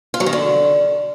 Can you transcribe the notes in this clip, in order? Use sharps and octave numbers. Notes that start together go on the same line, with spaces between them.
F4
F#3
D#3
D3